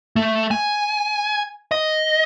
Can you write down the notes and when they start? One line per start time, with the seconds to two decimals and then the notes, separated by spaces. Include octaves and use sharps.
0.16 A3
0.51 G#5
1.71 D#5